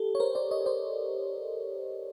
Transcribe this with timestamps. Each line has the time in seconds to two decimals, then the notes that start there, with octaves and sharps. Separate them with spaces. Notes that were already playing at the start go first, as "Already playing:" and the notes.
Already playing: G4 A4
0.15 C#5
0.20 A#4 C5
0.35 C5 D5
0.51 C#5 D#5
0.66 C5 D5